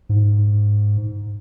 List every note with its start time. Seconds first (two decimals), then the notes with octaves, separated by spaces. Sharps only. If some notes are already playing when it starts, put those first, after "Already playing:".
0.09 G#2